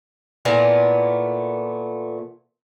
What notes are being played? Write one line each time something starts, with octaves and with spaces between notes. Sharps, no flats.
A#2 E3 A3 B3